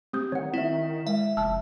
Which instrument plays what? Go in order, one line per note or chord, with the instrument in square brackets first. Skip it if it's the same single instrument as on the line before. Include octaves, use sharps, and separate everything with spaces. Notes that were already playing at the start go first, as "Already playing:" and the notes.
[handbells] C4 D#6 G6 [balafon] G4
[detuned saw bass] D#3 [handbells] C#5 F#5
[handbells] C4 E5 [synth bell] E4
[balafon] G#3 [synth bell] E5
[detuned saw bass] F1 [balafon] A5 [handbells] E6 F6